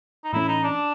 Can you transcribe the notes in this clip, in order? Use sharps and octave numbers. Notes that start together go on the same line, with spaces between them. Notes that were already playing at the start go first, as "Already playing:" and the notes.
D#4
A2 E3 A3 C#4 E4
D#4
D4